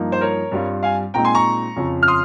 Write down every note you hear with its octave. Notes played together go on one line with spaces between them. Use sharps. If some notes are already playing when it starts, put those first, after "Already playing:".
Already playing: G2 F3 A#3 D#4
C5
A#4 C#5
G2 G3 C4 F4
F5 G#5
A#2 G#3 C4 D#4 G5 A#5
G#5 C6
A#5 C#6
F2 C#3 F3
F6
C6 D#6